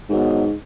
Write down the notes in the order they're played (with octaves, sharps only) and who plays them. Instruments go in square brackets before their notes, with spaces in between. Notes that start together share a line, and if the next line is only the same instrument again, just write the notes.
[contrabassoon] G#2 [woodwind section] D#3 F#3 B3